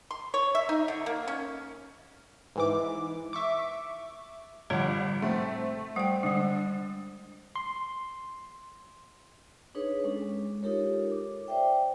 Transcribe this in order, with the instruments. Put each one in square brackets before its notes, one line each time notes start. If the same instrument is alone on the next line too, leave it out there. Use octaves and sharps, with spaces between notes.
[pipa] C6
C#5
E5
D#4
D3
A#3
C#4
[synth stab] G#2 E3 D6
E5 C#6 D6
[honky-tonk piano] G1 F#5 [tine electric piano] A2 F3 G3 [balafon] C#5
[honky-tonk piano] A3 C4 [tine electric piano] C6
[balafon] G3 G5 [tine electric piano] C5 F#5
[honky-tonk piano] D3 [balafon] G3 G#3
[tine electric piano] C6
[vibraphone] D4 D#4 G#4 B4 C#5
G#3 C#4 D4 A4
G#3
D#4 F4 G4 A4 A#4 C#5
D6
C5 D5 E5 G5